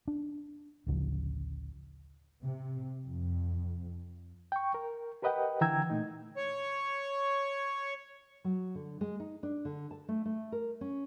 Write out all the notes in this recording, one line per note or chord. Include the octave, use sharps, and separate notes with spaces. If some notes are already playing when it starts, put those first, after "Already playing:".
D4
A1 D2 C#3 F3
C3
F2
G5 C#6
A#4
G4 A#4 B4 D#5 F#5 G5
D3 E3 G5 A#5 E6 G#6
A#2 A3 D#4
C#5 C#6
F#3
D3
G#3
D#4
D4
D3
A5
A3
A3
A#4
C#4